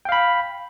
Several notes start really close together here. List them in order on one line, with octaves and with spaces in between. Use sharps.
G5 F5 B5